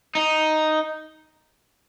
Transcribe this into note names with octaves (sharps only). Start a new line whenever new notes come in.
D#4